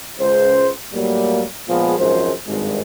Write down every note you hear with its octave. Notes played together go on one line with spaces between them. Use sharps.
C#2 C#3 C5
A2 F#3 G3 A#3
A#2 F3 G#3 A#3 B3 G#4
G#1 F#2 F3 G#3 C5
G#1 G2 G#3